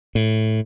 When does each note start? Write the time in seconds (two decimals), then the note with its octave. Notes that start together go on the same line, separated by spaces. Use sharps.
0.15 A2